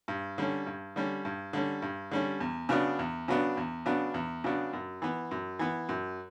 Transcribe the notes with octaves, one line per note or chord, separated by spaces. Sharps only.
G2
D3 G3 C#4
G2
D3 G3 C#4
G2
D3 G3 C#4
G2
D3 G3 C#4
E2
C#3 F#3 B3 D4
E2
C#3 F#3 B3 D4
E2
C#3 F#3 B3 D4
E2
C#3 F#3 B3 D4
F#2
E3 B3
F#2
E3 B3
F#2